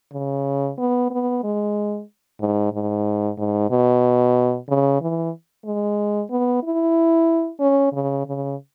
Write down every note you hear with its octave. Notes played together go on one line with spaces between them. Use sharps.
C#3
B3
B3
G#3
G#2
G#2
G#2
B2
C#3
E3
G#3
B3
E4
C#4
C#3
C#3